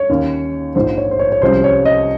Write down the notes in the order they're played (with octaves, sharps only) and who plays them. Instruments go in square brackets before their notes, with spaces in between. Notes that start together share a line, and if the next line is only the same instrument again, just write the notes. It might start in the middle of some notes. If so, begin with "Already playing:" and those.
Already playing: [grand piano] C#5
D#2 D#3 A#3 C#4
A#1 G#2 F3 G#3 C5
C#5
C5
C#5
C#5
C2 C3 F3 G#3 C#4 C5
C#5
D#5